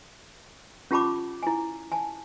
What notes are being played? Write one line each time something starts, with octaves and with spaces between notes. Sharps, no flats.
C#4 F4 G4 A5 B5 D6
E4 G#5
G#5 A5